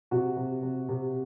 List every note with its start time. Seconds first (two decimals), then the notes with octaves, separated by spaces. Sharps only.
0.11 C3 F#4
0.36 C3
0.63 C3
0.89 C3